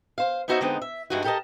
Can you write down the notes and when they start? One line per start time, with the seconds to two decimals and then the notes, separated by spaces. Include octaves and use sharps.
0.18 C5 F5
0.48 B3 C#4 D#4 F#4 C5 E5
0.61 D3 G#3 B3 C4 D#4
0.82 E5
1.10 G2 E3 G#3 D#4 F#4
1.24 G4 A4 A#4 D#5 A5